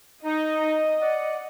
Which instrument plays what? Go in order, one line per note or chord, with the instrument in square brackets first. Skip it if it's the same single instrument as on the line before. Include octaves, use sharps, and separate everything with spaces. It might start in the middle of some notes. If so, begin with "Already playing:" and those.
[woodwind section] D#4 [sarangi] D#5
[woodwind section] D5 F#5